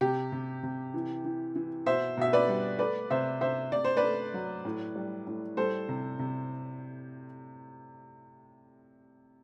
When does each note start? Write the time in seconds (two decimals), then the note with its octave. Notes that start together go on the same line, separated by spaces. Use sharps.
0.01 C3 G4
0.32 C3
0.63 C3
0.94 E3
1.25 E3
1.56 E3
1.86 B2 C5 E5
2.17 B2 E5
2.33 B4 D5
2.48 G3
2.79 A3 B4 D5
3.10 C3 C5 E5
3.41 C3 C5 E5
3.72 C3 D5
3.85 C5
3.97 B4 D5
4.03 A3
4.34 F#3
4.65 A2
4.96 G3
5.27 A2
5.57 G3 A4 C5
5.89 C3
6.19 C3